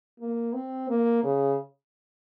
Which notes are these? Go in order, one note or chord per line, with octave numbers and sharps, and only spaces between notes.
A#3
C4
A#3
C#3